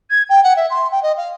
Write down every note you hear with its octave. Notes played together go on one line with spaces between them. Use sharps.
G#6
G5
F#5
E5
C6
G5
D#5
F5